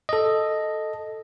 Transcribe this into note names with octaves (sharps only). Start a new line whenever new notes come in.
A4 D#5